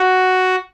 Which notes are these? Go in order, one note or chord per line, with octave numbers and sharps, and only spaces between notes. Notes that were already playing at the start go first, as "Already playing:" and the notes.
Already playing: F#4